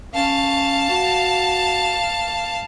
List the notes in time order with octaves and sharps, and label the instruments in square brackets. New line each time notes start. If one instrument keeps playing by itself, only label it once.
[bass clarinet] C#4 [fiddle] F5 A5
[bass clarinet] F#4